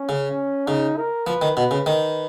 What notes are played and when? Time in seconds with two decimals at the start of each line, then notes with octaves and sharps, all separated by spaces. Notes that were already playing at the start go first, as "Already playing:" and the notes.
Already playing: C#4
0.09 C#3
0.67 C#3 D#4
0.97 A#4
1.26 F3 B4
1.42 D#3
1.57 B2 B4
1.71 C#3
1.86 D#3 B4